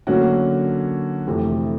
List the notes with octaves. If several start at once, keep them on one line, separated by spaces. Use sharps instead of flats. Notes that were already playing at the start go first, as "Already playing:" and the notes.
D3 F#3 A#3 C#4 F#4
F2 C3 E3 A3